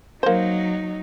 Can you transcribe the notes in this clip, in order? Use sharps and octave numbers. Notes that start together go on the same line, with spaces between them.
F#3 A#3 D#4 C5